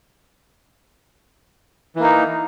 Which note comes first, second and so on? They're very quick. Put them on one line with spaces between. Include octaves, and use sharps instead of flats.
E3 A#3 D#4